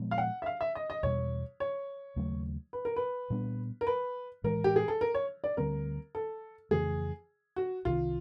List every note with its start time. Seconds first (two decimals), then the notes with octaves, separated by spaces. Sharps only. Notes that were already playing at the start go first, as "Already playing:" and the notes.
Already playing: A#2 F3 G#3 B3
0.11 F5
0.18 F#5
0.42 E5
0.46 F5
0.61 E5
0.75 D#5
0.90 D#5
1.03 E2 B2 G3 C#5
1.60 C#5
2.16 D#2 C#3 F#3 A3
2.73 B4
2.85 A#4
2.96 B4
3.30 A#2 G3 B3 D4
3.81 A#4
3.87 B4
4.44 A2 E3 G#3 A#4
4.64 G4
4.76 G#4
4.88 A4
5.01 A#4
5.14 C#5
5.44 D5
5.57 D2 D3 G3 C4 A#4
6.15 A4
6.71 F2 C#3 E3 A3 G#4
7.56 F#4
7.85 C2 C3 D#3 F4